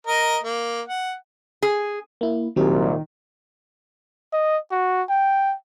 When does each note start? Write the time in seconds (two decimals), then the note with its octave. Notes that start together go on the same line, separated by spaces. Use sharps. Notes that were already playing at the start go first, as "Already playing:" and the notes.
0.07 A#4 D#5
0.43 A#3
0.88 F#5
1.63 G#4
2.21 A#3 E4
2.56 C2 A#2 D#3 F#3 C4 G4
4.33 D#5
4.71 F#4
5.10 G5